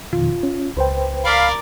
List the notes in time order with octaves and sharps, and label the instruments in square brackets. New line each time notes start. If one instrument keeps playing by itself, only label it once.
[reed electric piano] F2 B2 D#3 [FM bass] F4
[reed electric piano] C#4
[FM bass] C#2 [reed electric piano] B4 C5 G5
[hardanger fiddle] A#4 D5 [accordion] F5 B5